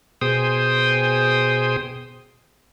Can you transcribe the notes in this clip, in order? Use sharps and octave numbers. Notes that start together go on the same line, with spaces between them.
B2 G#4 C5 G5 D#6